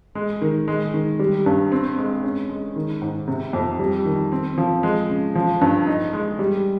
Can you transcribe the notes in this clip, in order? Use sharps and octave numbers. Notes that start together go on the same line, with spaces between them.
G#3
D#3
G#3
D#3
G3
G2
C4
G#3
C#4
G#3
D#3
G#2
C3
F2
G3
D#3
C4
F3
G#3
C#3
F3
G2
D#4
G#3
G3